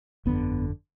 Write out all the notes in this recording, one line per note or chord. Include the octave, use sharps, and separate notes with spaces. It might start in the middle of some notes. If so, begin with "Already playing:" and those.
G1 F2 D3 B3